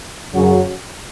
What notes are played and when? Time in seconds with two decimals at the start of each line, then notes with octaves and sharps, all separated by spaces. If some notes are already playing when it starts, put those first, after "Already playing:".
0.34 F#2 C#3 F#3 C#4 F#4